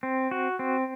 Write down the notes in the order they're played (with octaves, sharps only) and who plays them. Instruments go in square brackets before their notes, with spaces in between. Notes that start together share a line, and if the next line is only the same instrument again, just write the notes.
[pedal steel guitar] C4
F#4
C4